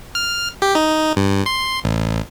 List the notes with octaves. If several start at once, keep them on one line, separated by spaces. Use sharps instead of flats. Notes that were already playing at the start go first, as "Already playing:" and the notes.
F6
G4
D#4
G2
C6
A1